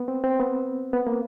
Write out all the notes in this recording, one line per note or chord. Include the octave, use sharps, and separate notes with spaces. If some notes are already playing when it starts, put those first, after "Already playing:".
Already playing: B3
C4
C4
B3
B3
A#3